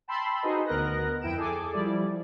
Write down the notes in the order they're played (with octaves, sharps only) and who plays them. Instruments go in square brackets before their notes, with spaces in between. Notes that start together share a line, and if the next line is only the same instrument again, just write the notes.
[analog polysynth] G5 A5 B5 C6 E6
D#4 F#4 G#4 B4 C5 D#5
D2 B3 A#4 D#5 F#6 A#6
F2 E4 G5 D7 E7
G#4 A4 G#5 D6
F3 G3 E4 D5